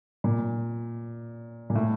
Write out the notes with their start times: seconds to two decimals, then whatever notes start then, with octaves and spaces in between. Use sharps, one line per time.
0.24 A#2
1.70 A#2
1.75 A2